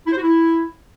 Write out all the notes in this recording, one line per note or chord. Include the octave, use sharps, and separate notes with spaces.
E4
C5
F#4
E4